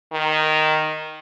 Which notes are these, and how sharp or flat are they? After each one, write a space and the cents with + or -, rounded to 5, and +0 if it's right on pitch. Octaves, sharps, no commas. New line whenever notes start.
D#3 -5